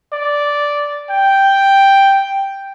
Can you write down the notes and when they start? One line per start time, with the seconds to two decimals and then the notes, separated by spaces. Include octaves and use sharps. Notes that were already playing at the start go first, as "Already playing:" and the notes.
0.12 D5
1.09 G5